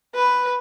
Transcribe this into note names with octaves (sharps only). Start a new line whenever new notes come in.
B4